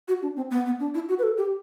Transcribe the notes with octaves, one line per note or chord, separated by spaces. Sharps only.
F#4
D4
C4
B3
B3
D4
E4
F#4
B4
A4
G4